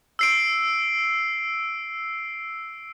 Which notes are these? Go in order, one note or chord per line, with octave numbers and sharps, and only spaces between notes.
E6 C7 D7